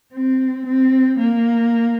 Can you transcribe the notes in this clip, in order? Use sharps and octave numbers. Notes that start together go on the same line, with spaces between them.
C4
C4
A#3